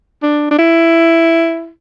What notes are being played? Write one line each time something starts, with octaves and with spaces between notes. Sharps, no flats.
D4
D4
E4